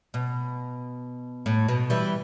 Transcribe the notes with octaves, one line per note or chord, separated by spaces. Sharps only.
B2
A2
B2
E3 G3